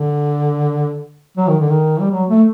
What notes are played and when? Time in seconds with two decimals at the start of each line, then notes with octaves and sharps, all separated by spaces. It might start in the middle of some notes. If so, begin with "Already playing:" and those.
Already playing: D3
1.37 F#3
1.48 D#3
1.59 D3
1.70 D#3
2.01 G3
2.11 F#3
2.29 A3